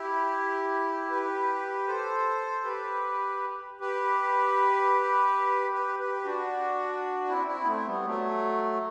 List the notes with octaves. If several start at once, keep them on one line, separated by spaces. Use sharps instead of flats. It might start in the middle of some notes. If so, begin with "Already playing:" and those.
Already playing: E4 G4
G4 B4
A4 C5
G4 B4
G4 B4
G4 B4
G4 B4
D4 F#4
C4 E4
C4 E4
B3
A3 C4
G3 B3
F#3 A3